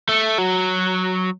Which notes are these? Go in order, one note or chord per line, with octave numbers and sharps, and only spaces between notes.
A3
F#3